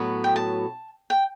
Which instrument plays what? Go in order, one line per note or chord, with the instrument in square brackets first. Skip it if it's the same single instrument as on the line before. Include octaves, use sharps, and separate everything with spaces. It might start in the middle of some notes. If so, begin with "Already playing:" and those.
Already playing: [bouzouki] A2 F#3 B3 F#4
[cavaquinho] G5
A5
G5